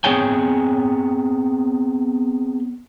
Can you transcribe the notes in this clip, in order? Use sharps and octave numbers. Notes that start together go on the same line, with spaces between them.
B3 C4 G#4 C#5 G5 G#5